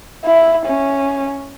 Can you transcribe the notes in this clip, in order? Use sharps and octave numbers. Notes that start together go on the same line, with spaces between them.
E4
C#4